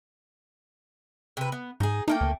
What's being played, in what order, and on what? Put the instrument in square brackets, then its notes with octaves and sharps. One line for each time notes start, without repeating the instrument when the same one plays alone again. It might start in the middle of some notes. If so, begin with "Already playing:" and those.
[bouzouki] C3 B4
B3
[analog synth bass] G#2 [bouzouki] D#4 G#4
[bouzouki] A3 A#3 G5 [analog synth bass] D#4
[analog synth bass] D2